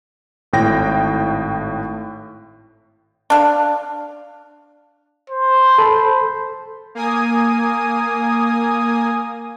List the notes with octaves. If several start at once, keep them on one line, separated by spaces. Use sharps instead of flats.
G#1 A2 G5 A#6
D4 F5
C5
A4 B5
A#3 G#5 D#6